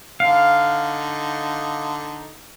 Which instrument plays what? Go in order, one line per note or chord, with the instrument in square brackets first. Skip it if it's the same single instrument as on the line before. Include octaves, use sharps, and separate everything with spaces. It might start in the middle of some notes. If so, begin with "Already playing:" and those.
[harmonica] D3 D#4 [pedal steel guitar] F5